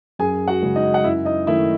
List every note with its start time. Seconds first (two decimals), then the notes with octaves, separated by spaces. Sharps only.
0.19 F#2 G#4 G#5
0.48 F#4 F#5
0.62 C#3 G#3 C#4
0.76 D#4 D#5
0.94 F#5
1.04 F#2 E4 E5
1.25 D#4 D#5
1.47 D#3 A3 C#4 E4 E5